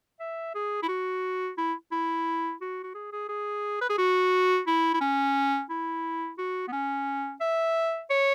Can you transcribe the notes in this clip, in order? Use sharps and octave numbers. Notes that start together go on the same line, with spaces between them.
E5
G#4
E4
F#4
E4
E4
F#4
F#4
G#4
G#4
G#4
B4
G#4
F#4
E4
E4
C#4
E4
F#4
B3
C#4
E5
C#5